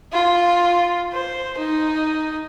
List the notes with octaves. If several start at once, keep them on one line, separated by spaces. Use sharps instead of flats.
F4
C5
D#4